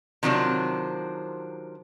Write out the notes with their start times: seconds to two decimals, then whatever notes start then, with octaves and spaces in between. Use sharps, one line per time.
0.23 C3 D#3 F3 F#3 C4 D4